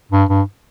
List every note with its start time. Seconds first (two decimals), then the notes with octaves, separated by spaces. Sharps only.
0.12 G2
0.29 G2